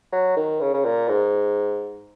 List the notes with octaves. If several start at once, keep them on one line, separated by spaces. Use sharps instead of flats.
F#3
D#3
C#3
C#3
A#2
G#2